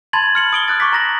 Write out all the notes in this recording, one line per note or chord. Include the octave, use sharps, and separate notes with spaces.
A5 B5 C6 G#6 A6 F#7
F6 C#7 F#7
D#6 D7 G7
D#6 F#6 A6
C#6 D6 B6
A#5 A#6 F#7